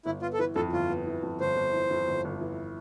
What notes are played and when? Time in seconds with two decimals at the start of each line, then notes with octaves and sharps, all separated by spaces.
0.06 G1 E4
0.22 B3 F4
0.33 A4
0.39 E3 B4
0.56 F2 A4
0.72 G1 F4
0.90 B3
1.06 E3
1.23 F2
1.40 G1 C5
1.57 G1
1.73 E3
1.91 F2
2.08 G1
2.25 G1
2.41 E3